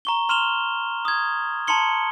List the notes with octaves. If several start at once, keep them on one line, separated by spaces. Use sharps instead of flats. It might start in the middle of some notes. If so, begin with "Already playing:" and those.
A#5 C#6 G7
C6 F6 E7 F7 G7
D#6 G#6
A5 A#5 C6 C#7 G7